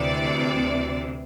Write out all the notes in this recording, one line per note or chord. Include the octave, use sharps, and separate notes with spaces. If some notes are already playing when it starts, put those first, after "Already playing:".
Already playing: D2 C3 E3 D5